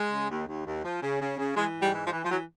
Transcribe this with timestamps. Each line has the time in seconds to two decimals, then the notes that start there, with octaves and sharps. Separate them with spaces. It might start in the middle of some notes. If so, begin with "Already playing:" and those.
Already playing: G#3
0.11 C#3
0.29 D#2
0.47 D#2
0.66 D#2
0.85 F3
1.02 C#3
1.21 C#3
1.39 C#3
1.57 E3 G#3
1.76 G#2
1.81 G3
1.94 E3
2.07 F3
2.12 E3
2.25 F3
2.31 E3 F#3